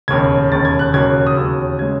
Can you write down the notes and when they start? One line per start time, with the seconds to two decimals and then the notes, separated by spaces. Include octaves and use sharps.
0.08 E1 D#2 C#3 G#6
0.51 E1 D#2 C#3 A6
0.65 G#6
0.79 F#6
0.94 E1 D#2 C#3 F#3 G#6
1.27 D#6
1.36 E1 D#2 C#3 F#3 E6
1.79 C#3 G#3 G#6